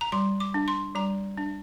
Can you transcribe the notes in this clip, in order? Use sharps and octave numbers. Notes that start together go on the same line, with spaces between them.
A#5
G3 C6
D6
D4
C6
G3 A#5
D4